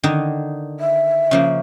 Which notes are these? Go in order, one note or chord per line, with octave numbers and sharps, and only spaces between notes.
D3 D#3 D#4
E5
C#3 F3 A#3